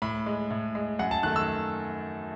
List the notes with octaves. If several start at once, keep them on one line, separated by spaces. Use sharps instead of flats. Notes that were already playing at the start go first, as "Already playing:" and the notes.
A2 B5
G#3
A2
G#3
F#2 F#5
A5
D#3 A3 F#6
E6